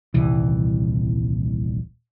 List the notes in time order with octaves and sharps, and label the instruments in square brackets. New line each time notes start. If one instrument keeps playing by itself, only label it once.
[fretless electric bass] D#1 C2 E3